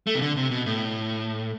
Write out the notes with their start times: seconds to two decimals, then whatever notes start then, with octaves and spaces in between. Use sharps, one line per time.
0.07 A3
0.15 C3
0.22 D3
0.37 C3
0.51 B2
0.66 A2